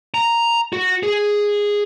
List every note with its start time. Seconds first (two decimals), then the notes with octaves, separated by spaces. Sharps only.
0.14 A#5
0.73 F#4
1.03 G#4